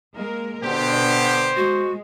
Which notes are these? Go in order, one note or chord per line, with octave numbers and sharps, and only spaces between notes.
G#3 A#3 A#4
B2 D3 B3 D4 G4 C5
G#3 F#4